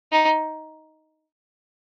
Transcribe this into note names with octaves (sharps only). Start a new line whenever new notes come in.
D#4